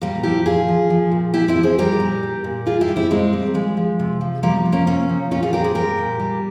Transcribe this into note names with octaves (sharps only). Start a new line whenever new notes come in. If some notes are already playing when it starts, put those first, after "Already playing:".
A#2 G3 A#3
F3 E4 G4
A#2 F4 G#4
F3
F3
A#2
A#2 E4 G4
C4 E4
F3
G#4 C5
G3 G4 A#4
A#2
G3
A#2
G3 F4 G#4
E4 G4
G3
C4 E4
A#2 G#3 C4
G3
F3 G#3
F3
C3
F3
F3 G3 A#3
C3
A#3 C#4
C3 A#3 C#4
F3
A#2 C#4 F4
F4 G#4
G3 G4 A#4
G#4 C5
G3 G4 A#4
A#2
G3